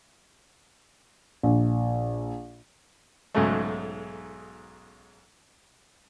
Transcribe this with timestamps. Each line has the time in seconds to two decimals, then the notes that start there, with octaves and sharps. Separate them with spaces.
1.43 A#1
3.35 B1 G#2 C#3 F#3 G#3 A3